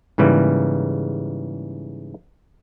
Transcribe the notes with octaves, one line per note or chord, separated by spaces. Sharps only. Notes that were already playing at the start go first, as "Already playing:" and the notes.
G#2 C#3 E3 G3 A#3